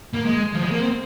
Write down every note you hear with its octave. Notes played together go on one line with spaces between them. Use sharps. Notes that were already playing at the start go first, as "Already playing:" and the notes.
A#3
G#3
F3
G#3
A#3
C4